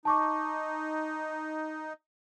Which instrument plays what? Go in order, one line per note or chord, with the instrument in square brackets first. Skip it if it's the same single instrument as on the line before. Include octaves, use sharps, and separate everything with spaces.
[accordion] D#4 [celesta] A5 C#6 D6